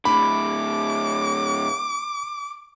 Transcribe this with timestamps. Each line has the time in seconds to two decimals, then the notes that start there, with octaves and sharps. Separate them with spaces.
0.05 A2 D3 B5 D6